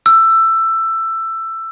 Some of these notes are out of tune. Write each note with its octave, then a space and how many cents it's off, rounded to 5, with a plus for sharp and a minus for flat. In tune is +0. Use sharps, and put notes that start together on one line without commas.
E6 +15